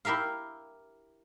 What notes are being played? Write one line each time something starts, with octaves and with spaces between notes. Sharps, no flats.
E4 G4 A#4 E5 F5